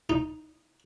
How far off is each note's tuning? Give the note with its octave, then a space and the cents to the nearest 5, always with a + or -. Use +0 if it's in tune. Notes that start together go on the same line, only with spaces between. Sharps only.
D#4 -5